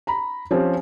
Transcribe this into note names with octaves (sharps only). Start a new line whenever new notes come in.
A#5 B5
F3 C4 C#4 G4